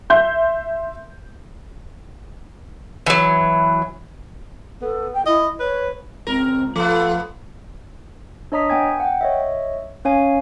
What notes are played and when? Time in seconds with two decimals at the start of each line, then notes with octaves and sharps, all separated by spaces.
0.10 E5 C6 G6
3.06 E3 F#3
4.82 B3 A4
5.14 G5
5.26 E4 D#5
5.60 B4 C#5
6.27 C#2 C4 A#4
6.76 F3 A3 B3 F4 A4
8.52 D4 C#5 D#5 A#5 D#6 B6
8.70 B3 G5 G#5 G#6
9.00 F#5 G5
9.21 C#5 D#5 E5
10.05 C#4 C#5 F5 G#5